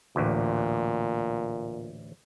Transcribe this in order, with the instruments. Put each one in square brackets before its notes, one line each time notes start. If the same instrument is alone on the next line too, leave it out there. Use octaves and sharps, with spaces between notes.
[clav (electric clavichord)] A1 D2 [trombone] A#2